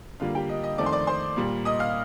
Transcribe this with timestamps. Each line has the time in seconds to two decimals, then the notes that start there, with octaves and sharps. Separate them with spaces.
0.20 D3 G3 A#3 F4 F5
0.35 G4 G5
0.49 D#5
0.63 D#5
0.78 F2 D#3 A3 C4 D5 D6
0.86 C6
0.92 D5 D6
1.07 C5 C6
1.36 A#2 G3 A#3
1.65 D#5 D#6
1.79 F5 F6